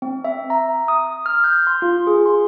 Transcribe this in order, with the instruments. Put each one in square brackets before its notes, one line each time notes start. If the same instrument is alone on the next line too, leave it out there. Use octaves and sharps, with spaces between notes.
[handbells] C4
E5
A#5
D#6
F6
G6
C6
F4
G#4
C6